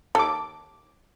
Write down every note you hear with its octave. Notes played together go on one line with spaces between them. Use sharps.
D#2 A4 D6